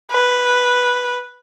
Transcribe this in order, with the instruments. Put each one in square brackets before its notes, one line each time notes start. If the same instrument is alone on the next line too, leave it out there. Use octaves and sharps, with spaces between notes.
[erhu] B4